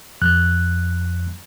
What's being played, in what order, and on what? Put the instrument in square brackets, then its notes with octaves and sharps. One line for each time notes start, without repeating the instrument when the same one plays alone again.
[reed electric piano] F2 F#6